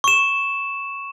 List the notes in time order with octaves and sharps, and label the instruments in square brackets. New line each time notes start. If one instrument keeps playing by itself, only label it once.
[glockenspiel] C#6 E7